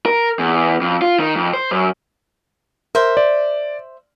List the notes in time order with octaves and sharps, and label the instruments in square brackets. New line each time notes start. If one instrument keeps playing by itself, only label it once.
[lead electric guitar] A#4
E2
F2
F4
D#3
F2
C5
F#2
[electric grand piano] A#4 [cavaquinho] C5 E5
[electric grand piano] D5